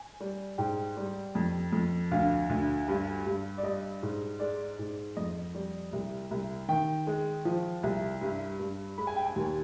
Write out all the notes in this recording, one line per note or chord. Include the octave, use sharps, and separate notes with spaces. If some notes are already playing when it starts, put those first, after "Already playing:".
Already playing: G#5
G3
G#2 G5
G3
F2
F2
D2 F5
D2
G2
G2
D5
G3 D#5
G#2
G#3 D5
G#2
F2 D#5
G3
C2
C2
D#3 G5
G#3
F3
C2
G2
G2
G#3 B5
G#5
G5
G#5
D#2